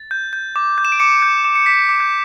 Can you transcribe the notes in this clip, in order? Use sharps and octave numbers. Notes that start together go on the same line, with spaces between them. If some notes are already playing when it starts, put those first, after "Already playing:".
Already playing: A6
G6
G6
D6
G6
E7
D7
D6 C#7
G6
D6
C#7
D6 B6
D6
G6